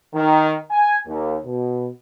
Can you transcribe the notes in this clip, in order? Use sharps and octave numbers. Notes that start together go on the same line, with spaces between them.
D#3
G#5
D#2
B2